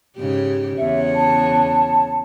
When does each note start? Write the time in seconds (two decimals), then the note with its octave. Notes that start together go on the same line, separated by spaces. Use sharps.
0.18 G#2 C#3 G4
0.78 E2 C#3 C#5 E5
1.15 A5